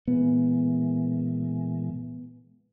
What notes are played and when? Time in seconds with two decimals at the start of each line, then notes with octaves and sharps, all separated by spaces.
0.08 A#2 E3 G#3 B3